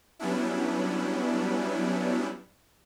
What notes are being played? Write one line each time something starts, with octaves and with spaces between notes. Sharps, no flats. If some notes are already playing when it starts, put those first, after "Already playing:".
F#3 G3 B3 C#4 D4 E4